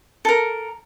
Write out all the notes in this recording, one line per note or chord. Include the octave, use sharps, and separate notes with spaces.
A4 A#4